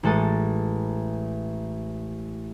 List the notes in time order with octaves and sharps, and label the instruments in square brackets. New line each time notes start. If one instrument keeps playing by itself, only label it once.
[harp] A1 G#3 A4 A5 D#6